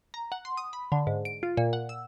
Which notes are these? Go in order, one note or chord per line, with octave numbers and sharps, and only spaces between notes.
A#5
F#5
C6
D#6
B5
D3
G#2
D7
F4
A#2
F#5
E6